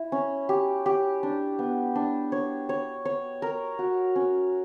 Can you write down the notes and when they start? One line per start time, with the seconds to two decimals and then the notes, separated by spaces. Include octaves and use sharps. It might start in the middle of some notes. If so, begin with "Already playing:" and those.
Already playing: E4
0.12 C#4
0.49 G4
0.86 G4
1.23 D4
1.59 B3
1.95 D4
2.32 C#5
2.69 C#5
3.05 C#5
3.42 A#4
3.79 F#4
4.16 C#4